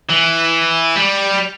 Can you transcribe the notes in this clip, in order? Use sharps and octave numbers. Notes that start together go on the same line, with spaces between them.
E3
G3